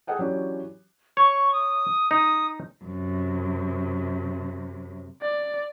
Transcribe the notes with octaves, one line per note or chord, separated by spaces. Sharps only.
G#4 A4 D#5 F#5 G5
E3 F#3 C#4 D4 G4 C#5
C#5 C#6
D#6
D#4 D#6
F#2 C3
D5